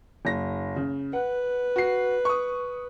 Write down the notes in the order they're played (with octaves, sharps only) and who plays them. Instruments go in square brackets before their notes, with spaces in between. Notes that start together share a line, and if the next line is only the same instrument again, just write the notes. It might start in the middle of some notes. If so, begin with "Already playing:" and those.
[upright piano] F#1 A#6
C#3
[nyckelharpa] B4 [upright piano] F#5
[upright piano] F#4 C7
C#6 D#6